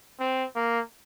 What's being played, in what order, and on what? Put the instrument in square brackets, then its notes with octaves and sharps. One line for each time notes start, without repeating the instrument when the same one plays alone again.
[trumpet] C4
A#3